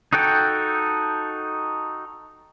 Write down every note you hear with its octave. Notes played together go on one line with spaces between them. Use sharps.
D#4 F#4 A4 G5